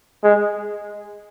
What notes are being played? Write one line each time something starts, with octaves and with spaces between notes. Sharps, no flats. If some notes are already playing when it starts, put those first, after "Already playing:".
G#3